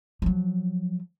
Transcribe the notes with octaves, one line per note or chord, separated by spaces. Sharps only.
F3 F#3